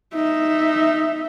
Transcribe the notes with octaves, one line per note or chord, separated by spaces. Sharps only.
D#4 E5